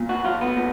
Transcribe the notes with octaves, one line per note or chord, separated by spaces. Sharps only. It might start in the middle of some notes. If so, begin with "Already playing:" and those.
Already playing: A#2
F#4
F#3 F4
B3
A#2